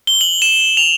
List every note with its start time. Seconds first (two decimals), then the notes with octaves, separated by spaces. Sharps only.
0.07 G7
0.21 F#7
0.42 E7
0.77 F7